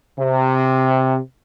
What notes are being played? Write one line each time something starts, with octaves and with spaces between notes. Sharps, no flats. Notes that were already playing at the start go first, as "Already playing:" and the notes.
C3